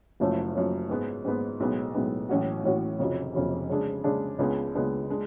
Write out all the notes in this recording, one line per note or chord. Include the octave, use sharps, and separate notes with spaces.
F#1 F#2 F3 A3 C#4
F#1 F#2 F3 A3 C#4
G#2 G#3 B3
G#2 G#3 B3
B1 A2 G#3 B3
B1 A2 G#3 B3
A1 A2 F#3 C#4 F#4
A1 A2 F#3 C#4 F#4
F1 F2 C#3 F#3
F1 F2 C#3 F#3
C#3 G#3 D4 G#4
C#3 G#3 D4 G#4
C#2 C#3 G#3 B3 D4
C#2 C#3 G#3 B3 D4
G#3 D4